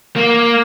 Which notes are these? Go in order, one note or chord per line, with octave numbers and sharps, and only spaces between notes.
A#3